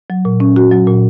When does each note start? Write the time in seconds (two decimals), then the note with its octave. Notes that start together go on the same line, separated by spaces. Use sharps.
0.10 F#3
0.25 A#2
0.40 C#4
0.56 F#4
0.71 F#3
0.87 A#2